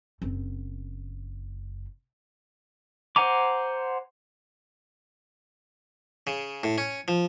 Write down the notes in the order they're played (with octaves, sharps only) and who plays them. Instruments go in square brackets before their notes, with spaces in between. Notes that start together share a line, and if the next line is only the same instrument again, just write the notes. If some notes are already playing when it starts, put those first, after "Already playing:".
[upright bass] F#1 C4
[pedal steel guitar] C5 F#5 G#5 A#5 D6
[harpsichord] C#3
A2
C#4
F3